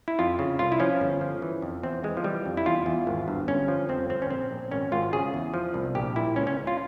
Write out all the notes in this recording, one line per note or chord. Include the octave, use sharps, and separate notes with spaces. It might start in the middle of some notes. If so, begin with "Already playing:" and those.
E4
F2 F4
C#3
C2 F4
E4
F3 C#4
G1
F3
E3
F2
E2 C4
E3 G#3
F3
E3 G3
F2
E4
E2 F4
E2
G#1
G2
G1 C#4
F3
F2 C4
G1 C4
C#4
A#1 C4
A#1
G#1 C#4
G#1 F4
C#3 G#4
E2
F3
C2
A#1 G4
A#2 E4
C#2 C#4
C#4
C#3
F4